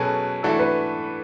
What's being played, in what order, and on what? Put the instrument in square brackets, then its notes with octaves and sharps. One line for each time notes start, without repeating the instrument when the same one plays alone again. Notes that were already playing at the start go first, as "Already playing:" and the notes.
Already playing: [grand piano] B2 F#3 C#4 G#4 B4 [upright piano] A4
[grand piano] E3 A3 D4 F#4 [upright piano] A4
[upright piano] B4